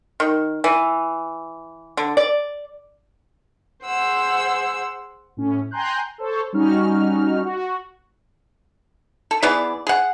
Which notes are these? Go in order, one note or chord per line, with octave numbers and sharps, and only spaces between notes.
D#3
E3
D3
D5
G#4 C5 F#5 E6
A2 C#4
G5 G#5 A#5 C6 F#6 G6
A4 C5 C#5
G3 C#4 D#4 F#4 F6
F#4
A4
E3 B3 G#4 D5
G#4 F#5